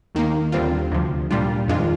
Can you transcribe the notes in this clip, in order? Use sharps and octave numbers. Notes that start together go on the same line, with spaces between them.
D#2 D#3 A#3
D#2 D3 G3 C4 F4
D2 C3 F3
A#2 G3 D4 F4
F2 D#3 G#3 D4 F4